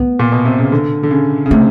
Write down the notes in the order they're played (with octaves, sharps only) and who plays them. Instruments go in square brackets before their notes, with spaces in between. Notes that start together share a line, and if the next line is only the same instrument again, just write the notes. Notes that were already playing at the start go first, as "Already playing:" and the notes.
Already playing: [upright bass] B3
[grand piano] A#2
B2
C3
C#3
D3
D3
C#3
C#3
[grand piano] C3 [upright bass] A3